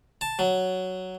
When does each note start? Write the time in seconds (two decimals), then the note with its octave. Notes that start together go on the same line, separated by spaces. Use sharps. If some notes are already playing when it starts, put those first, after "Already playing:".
0.21 A5
0.39 F#3